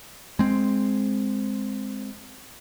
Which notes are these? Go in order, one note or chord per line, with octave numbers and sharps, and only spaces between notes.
G#3 C4